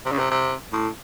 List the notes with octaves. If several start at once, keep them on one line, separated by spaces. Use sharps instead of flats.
C3
C#3
C3
C3
A2